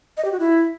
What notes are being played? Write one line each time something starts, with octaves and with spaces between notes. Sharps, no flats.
D#5
G4
F#4
E4